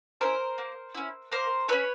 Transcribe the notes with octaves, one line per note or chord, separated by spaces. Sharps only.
C#4 E4 A#4 C5
A#3
C#4 E4
A#3 A#4 C5
C#4 E4 B4 C#5